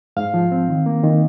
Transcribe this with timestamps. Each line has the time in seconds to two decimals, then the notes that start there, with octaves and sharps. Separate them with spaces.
0.17 G#2 F5
0.34 F3
0.51 C4
0.69 D#3
0.86 A#3
1.03 D#3